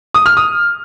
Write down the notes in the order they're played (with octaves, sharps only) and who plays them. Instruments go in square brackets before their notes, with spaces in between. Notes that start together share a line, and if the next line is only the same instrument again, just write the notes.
[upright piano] D#6
F6
D#6